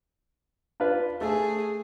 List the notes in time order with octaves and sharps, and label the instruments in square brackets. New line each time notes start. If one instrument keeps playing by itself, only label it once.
[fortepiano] D4 F4 B4
[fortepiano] A3 [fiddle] G#4